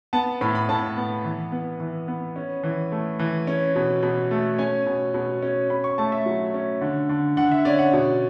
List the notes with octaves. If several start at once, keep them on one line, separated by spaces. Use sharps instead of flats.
B3 A5
A2 B5
B5
A2 A5
B3
E3
B3
E3
B3
C#4
E3
A3
E3
C#4
B2
B2
A3
C#4 G#5
B2
B2
C#4
C#4 B5
C#6
A3 A5
E5
F#3
C#4
D3
D3
D3 F#5
E5
C#4 D5
F#5
B2